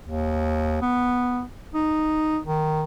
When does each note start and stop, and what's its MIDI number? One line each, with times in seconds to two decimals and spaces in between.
0.05 0.80 39
0.81 1.42 59
1.74 2.39 63
2.45 2.84 51